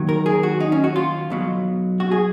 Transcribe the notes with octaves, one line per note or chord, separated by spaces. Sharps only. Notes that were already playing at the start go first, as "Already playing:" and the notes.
Already playing: D#2 D#3 F#3
A#4
G#4
F#4
D#4
C#4
F#4
F4
B1 B2 F#3
F#4
G#4